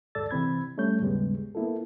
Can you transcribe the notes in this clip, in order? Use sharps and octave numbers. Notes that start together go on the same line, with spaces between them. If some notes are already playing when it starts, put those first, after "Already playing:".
D2 G#2 A4 D5 E6 A6
C3 E3 C4 B5 G#6
G3 A3 C#4 C#5 G6
D#2 G#2 C#3 G3 G#3 B3
A#3 B3 E4 F4 A4